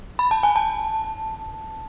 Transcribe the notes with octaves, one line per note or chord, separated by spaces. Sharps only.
B5
A5
G#5
A5